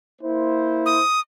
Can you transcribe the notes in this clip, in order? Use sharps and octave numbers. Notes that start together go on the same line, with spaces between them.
A#3 E4 C5
D#6